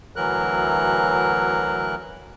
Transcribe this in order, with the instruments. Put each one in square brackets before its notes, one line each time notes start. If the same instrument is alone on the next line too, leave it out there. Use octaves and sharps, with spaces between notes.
[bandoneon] D2 E3 F#3 A#4 F#6